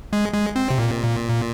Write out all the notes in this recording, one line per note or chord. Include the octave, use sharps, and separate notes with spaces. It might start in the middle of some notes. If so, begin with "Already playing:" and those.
G#3
G#3
C4
C3
A#2